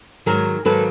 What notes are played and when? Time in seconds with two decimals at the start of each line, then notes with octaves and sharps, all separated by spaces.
0.26 G#2 D#3 F#3 G#4 A#4
0.65 G#2 D#3 F#3 A#3 A4 B4